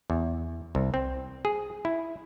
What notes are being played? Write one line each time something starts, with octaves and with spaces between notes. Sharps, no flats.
E2
C2
C4
G#4
E4